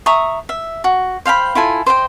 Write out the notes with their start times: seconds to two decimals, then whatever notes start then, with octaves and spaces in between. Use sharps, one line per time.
0.06 E5 A#5 C#6 D#6
0.49 E5
0.84 F#4
1.25 C5 F5 G5 B5
1.55 E4 F4 A4 G#5
1.86 C5 D#5 F5 G5